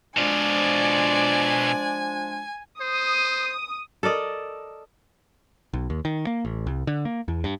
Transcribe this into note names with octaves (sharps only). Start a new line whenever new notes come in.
B2 F3 G#3 D4 F4 D5 G#5
C5 D#6
A4 A#4 D5 D#5
B1
D#2
D#3
A#3
A1
C2
D3
A#3
E2
G2